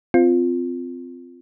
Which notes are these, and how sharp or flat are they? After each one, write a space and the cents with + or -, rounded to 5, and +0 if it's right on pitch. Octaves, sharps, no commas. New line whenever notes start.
C4 -20 F4 +0